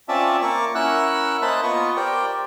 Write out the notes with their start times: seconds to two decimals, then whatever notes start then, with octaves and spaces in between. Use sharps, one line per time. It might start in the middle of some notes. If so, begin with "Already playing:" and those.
0.09 C4 C#4 F4 D5 E5 A5
0.42 A#3 C#6 D6
0.75 C#4 E4 A#4 F#5 E6 F#6
1.42 A#3 C5 D#5 A5 B5 F#6
1.63 B3 F4 D#5 C#6
1.96 G4 A#4 C5 D5 G5